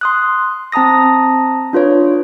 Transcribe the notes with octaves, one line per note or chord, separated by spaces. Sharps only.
C6 D#6 F#6
C4 A5 A#5 D#6 A#6
D4 F4 B4 C#5